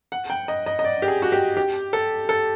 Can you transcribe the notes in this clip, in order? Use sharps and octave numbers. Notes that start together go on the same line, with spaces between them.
F#5
G5
D#5
D#5
D#5
D5
G4
G#4
F#4
G4
G4
A4
A4